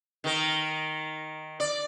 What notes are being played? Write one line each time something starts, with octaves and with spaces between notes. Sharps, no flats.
D#3 A#4
D5